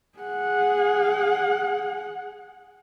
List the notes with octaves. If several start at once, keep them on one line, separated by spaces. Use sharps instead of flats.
G#4 F#5